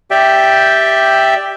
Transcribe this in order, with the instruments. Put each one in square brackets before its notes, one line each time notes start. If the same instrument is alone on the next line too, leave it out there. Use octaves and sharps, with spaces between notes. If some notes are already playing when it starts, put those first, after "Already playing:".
[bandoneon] G4 D5 E5 G5